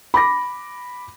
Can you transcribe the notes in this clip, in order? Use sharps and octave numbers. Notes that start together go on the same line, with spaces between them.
B5 D6 A#6